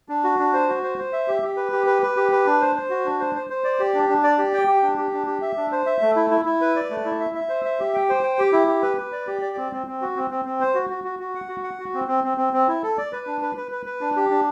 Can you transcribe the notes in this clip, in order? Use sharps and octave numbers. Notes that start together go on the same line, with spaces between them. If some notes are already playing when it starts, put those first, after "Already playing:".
D4
F#4
D4
C5
F#4
C5
C5
E5
G4
G4
B4
G4
B4
B4
G4
B4
D4
C5
C5
F#4
D4
C5
C5
C5
D5
G4
D4
D4
D5
G4
G5
G4
D4
G4
D4
G4
E5
D4
C5
E5
A3
E4
E4
E4
B4
D5
A3
E4
E5
E5
C5
E5
G4
G5
C5
G5
G4
E4
G4
B4
B4
D5
G4
D5
C4
C4
C4
F#4
C4
C4
C4
C5
F#4
F#4
F#4
F#4
F#5
F#4
F#5
F#4
C4
C4
C4
C4
C4
E4
A4
D5
B4
D4
B4
B4
B4
B4
D4
G4
D4